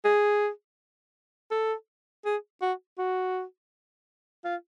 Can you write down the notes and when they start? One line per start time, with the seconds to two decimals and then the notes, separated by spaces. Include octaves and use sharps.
0.05 G#4
1.51 A4
2.25 G#4
2.62 F#4
2.98 F#4
4.45 F4